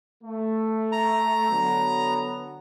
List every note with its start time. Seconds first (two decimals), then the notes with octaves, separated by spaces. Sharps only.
0.24 A3
0.92 A#5
1.51 D3 F#3 B3